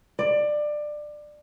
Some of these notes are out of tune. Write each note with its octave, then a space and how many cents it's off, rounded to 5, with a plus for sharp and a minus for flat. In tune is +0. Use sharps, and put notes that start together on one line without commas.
D5 +20